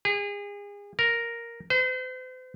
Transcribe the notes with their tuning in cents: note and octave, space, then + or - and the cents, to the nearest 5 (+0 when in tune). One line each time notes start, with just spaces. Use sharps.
G#4 -35
A#4 +0
C5 -40